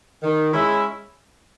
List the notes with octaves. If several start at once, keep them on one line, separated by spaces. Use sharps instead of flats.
D#3
G#3 C#4 E4